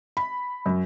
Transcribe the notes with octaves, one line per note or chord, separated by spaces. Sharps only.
B5
F#2